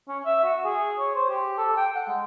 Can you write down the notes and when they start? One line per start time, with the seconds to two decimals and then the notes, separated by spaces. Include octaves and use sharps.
0.08 C#4
0.25 E5
0.44 F#4
0.65 G#4
0.98 C#5
1.15 C5
1.30 G4
1.58 A4
1.77 G5
1.95 F#5
2.08 G#3